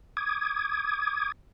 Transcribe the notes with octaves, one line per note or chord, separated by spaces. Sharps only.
D6 D#6 G#6